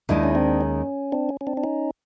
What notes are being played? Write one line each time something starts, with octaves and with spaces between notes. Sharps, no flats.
D#2 D#3 G#3 D4 E4
C#4
C4 D4
C#4
C4 D4
C#4
C#4
C4 D4
D4
C#4 D#4